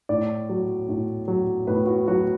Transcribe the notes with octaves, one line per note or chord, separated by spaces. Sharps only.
A2 D5
F#3
A2
F#3
A2 B4
F#4
F#3 F#4